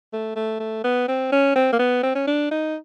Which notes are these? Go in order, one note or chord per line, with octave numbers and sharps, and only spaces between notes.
A3
A3
A3
B3
C4
C#4
C4
A#3
B3
C4
C#4
D4
D#4